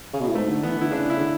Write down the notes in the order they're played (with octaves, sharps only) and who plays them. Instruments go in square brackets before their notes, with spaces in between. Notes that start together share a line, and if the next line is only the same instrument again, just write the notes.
[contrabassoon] C#3
B2
A2
[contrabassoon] G#2 [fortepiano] A3
[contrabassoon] D3
[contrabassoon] E3 [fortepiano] B3
[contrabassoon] D3 [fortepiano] E4
[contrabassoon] C#3 [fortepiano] D4
[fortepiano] E4
[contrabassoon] D3